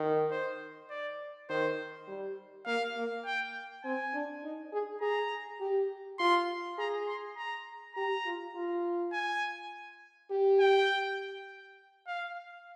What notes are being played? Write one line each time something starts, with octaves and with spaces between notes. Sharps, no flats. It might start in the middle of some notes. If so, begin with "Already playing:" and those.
Already playing: D#3
C5
D5
D#3 C5
G3
A#3 F5
A#3
G5
C4 G#5
D4
D#4
G#4
G#4 A#5
G4
F4 C6
G#4 A#5
C6
A#5
G4 A#5
F4
F4
G#5
G4
G5
F5